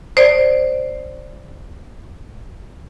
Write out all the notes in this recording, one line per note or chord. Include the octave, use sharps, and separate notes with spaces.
C5 D5